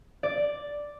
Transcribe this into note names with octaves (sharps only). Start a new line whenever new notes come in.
D5